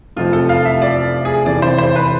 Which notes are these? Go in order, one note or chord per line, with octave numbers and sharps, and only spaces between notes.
F1 F2 C3 F3 A3 F4
A4
F5
E5
D5
G#4
F1 F2 C3 E3 D5
C5
C5
B4